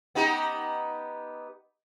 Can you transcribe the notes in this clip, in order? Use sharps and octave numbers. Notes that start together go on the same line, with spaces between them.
B3 D#4 G4